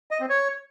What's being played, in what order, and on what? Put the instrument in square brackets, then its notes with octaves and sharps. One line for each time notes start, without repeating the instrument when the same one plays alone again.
[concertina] D#5
C4
C#5